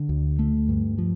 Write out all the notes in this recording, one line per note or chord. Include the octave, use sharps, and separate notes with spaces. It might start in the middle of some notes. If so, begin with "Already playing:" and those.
Already playing: D3
D2
A3
G2
F3